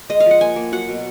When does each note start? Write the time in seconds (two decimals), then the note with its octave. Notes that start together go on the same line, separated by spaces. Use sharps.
0.10 G#3 D#5
0.20 F5
0.26 F3 F#5
0.41 A#3 G#5
0.56 A#3
0.72 F#3 F#5
0.88 B2